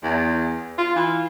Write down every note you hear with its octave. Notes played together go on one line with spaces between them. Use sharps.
E2
F4
E3